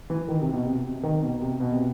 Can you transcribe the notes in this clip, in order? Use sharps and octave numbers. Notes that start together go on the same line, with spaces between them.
E3
D#3
C3
B2
C3
C3
D#3
B2
C3
B2
C3